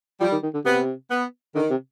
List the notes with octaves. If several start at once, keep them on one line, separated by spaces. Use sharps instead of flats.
F3 G3
D#3
D#3
D3
C3 B3
B3
D3 D#3
C3